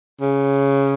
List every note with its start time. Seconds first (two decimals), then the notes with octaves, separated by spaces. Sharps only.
0.21 C#3